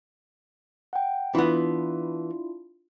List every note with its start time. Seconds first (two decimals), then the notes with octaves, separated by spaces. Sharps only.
0.93 F#5 G5
1.35 E3 B3 D4 E4 F4